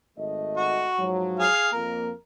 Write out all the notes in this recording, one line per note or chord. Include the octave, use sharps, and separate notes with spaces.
G#1 A3 D#5
F#4
G#2 F3 F#3
G#4 F5
F2 A#3 A#4